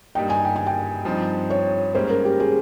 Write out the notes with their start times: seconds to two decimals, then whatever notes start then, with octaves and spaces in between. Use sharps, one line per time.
0.15 G2 G3 A#3 D#4 G5
0.30 G#5
0.45 G5
0.56 G#5
0.66 G5
1.05 G2 F3 C4 D#4
1.50 C#5
1.95 G#2 G3 A#3 C#4 C5
2.10 A#4
2.25 G4
2.40 G#4